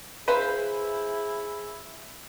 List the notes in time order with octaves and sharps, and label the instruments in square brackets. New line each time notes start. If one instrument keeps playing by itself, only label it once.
[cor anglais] E4 [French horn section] G#4 [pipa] B4 B5 [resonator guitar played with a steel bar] C5 F5